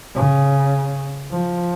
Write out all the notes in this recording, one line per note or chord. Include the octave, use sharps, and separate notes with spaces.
C#3
F3